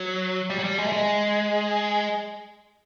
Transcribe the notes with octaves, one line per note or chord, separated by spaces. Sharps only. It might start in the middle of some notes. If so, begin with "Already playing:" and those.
Already playing: F#3
G3
F#3
G3
G#3
A3
G#3